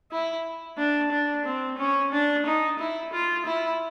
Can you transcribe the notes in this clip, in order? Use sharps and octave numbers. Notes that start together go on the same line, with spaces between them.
E4
D4
D4
C4
C#4
D4
D#4
E4
F4
E4